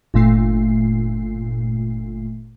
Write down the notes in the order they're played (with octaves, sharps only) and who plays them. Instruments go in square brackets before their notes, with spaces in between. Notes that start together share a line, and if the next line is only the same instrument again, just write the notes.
[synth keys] G1 A#2 A3 C7